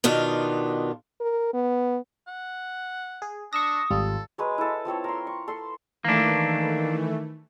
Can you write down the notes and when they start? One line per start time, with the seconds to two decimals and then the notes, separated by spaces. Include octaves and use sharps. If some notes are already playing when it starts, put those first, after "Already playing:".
0.04 B2 D#3 D4 F4
1.20 A#4
1.54 B3
2.28 F#5
3.22 G#4
3.53 D4 C#6 D#6 E6 A#6
3.90 G#1 G3 F4 A4
4.38 F#3 G#3 B4
4.58 E4 A4
4.85 F3 C4 A4 C#5
5.04 A#4 C6
5.27 C#6
5.48 A4 C6
6.05 D#3 E3 A3 A#3 D4